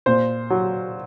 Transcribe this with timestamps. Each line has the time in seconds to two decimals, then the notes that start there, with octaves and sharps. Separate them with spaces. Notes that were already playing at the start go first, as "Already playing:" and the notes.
0.06 A#2 C5
0.50 F#3